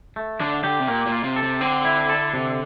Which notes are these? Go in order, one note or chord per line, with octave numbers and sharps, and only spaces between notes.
A3
D3 D4
D3 G4
C3
A#2 A#3
A#2
F4
C3
A4
C3
D3 C4
E4
A4
C3